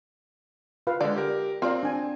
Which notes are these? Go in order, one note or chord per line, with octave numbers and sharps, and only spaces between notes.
F4 B4 F5
D3 G#3 D5
G4 A#4
C4 F4 A#4 D5 F5 A#5
D4 G#5